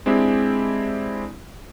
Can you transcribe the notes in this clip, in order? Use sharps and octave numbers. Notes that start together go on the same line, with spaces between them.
G#3 C4 D4 E4 G4